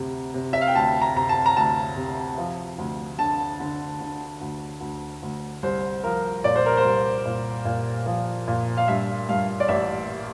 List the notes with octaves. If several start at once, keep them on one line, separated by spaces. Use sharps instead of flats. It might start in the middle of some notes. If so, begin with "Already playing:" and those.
Already playing: D2 C3
C3
E5
F5
G5
D2 A5
A#5
C3 A#5
A5
A#5
D2 A5
C3
F3
D2
D3 A5
D3
D3
D2
D2
D2
C2 C5
F3 A#4
A#2 D5
C5
A#4
C5
C2
A#2
A#2
F3
A#2
F5
G2 E5
G2 F5
D5
A1 E5